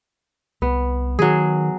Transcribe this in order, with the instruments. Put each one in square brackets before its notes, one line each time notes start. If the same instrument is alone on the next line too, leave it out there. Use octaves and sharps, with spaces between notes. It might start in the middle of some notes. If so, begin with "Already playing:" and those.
[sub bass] C2 [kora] B3
[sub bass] D#3 [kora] F#3 G#4